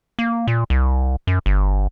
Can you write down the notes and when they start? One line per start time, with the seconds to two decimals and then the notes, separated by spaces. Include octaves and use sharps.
0.19 A#3
0.47 A#2
0.70 C2
1.27 F#2
1.46 G1